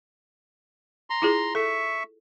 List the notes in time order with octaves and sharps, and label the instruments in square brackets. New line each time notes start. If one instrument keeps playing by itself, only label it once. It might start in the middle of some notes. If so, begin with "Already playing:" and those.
[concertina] A#5 C6
[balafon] E4 F4 G#4
[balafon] A4 [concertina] E5 C#6